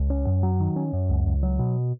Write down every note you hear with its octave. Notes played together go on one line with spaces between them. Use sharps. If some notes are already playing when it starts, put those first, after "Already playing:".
Already playing: C#2
C#4
F#2
F#3
D#3
C#4
F#2
C#2
C#2
F#3
B2